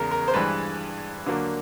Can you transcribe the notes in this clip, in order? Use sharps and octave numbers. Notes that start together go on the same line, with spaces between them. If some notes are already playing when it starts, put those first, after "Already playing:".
Already playing: E2 C#3 G#3 A#4
A#4
C5
G2 E3 G#3 B4
D3 F#3 A#3